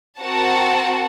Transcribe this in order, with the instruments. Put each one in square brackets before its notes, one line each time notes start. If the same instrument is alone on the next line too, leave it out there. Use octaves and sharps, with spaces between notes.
[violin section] C4 F#4 A#4 F#5 A5